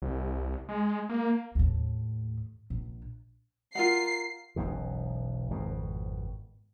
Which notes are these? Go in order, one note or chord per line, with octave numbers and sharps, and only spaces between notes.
C2
G#3
A#3
D#2 A2
A#1
F4 A#4 F#5 C7
E1 B1 F#2 B2
G#1 F2 B2